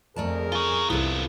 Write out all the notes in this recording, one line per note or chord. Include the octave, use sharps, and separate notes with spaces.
F2 A3 G#4 A#4 D5 A5
C#4 F4 G#5
C2 B3 E4 F4 A4